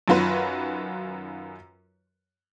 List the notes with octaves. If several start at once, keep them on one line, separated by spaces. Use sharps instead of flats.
F#2 D#3 F#3 F4 F#4 B4